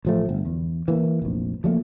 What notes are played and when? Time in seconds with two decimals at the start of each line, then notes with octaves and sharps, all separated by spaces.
0.05 A1 F3 A3
0.29 G1
0.45 E2
0.88 E3 A#3
1.22 F1 A#1
1.64 F3 F#3 A3 A#3